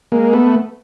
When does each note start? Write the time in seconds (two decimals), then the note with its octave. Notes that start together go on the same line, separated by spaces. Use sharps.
0.12 G#3 A#3
0.33 A3 B3